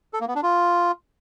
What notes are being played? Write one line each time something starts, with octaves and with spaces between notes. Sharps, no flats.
A4
A#3
B3
D4
F4